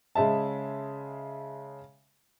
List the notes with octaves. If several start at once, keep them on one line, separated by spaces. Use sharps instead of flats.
C#3 G#3 E5 A5